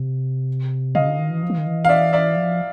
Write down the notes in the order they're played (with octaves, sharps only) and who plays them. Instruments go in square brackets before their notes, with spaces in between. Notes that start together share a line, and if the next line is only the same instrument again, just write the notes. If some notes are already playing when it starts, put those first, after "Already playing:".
Already playing: [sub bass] C3
[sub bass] C#3 [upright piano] D#5 F5
[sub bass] D3
D#3
E3
F3
E3
D#3
E3
[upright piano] F5
D5 E5
D5 E5
[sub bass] F3